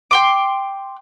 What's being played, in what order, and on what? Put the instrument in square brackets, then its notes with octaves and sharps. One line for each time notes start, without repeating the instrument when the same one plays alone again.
[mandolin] G5 C6 D6